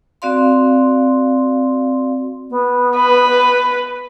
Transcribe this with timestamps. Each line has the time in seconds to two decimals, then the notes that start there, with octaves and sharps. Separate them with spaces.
0.22 C4 F#4 D5 F5 C6
2.50 B3
2.97 B4